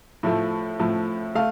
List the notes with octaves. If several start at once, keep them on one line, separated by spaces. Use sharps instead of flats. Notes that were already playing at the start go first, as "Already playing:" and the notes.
A2 F3 A3
A2 F3 A3
A3 F5